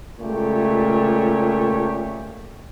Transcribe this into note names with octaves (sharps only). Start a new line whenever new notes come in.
C#2 A#2 A3 G4 C#5